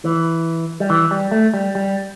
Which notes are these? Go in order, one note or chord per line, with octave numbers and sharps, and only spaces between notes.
E3
G3
E3
G3
A3
G3
G3